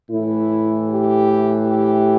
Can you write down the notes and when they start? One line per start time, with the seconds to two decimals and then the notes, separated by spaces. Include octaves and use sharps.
0.10 A2 E3 E4
0.89 G4
1.67 G4